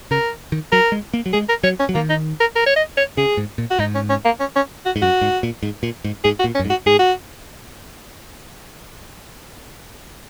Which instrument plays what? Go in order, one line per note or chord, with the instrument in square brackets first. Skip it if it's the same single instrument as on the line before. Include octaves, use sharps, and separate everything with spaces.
[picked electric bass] C#3 [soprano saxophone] A#4
[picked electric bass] D#3
[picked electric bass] F#3 [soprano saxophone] A#4
[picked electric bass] G#3
A#3
F#3
[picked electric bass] G#3 [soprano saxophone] G#4
[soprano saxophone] A#4
[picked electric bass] F#3 [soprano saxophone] C#5
[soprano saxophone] C#4
[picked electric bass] F#3
[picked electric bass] D#3 [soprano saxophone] A#3
[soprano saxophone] D#4
A#4
A#4
C#5
D#5
C#5
[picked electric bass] C#3 [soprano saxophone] G#4
[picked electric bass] G#2
A#2
[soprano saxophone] F#4
[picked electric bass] G#2 [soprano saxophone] D#4
[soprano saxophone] C#4
C#4
A#3
C#4
C#4
F#4
[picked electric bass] G#2
[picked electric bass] F#2 [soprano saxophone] F#4
[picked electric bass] G#2
A#2
G#2
A#2
G#2
[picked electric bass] G#2 [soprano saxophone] G#4
[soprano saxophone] F#4
[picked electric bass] A#2
[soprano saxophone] C#4
[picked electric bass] F#2
G#2
[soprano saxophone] F#4
[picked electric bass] G#2 [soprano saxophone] G#4
[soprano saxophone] F#4